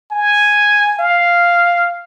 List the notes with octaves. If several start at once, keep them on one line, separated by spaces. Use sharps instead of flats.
G#5
F5